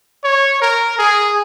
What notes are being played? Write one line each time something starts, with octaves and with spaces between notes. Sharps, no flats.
C#5
A#4
G#4